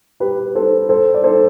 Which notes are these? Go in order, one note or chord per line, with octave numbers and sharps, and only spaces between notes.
G4 B4
A4 C5
A4 C5
D5
A4 C5